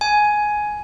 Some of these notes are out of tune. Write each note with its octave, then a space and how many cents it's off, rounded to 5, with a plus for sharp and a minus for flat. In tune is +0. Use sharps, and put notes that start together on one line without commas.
G#5 +10